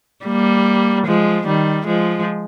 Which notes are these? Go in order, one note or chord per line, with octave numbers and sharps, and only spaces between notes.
G3 A#3
F3 G#3
D#3 G3
F3 G#3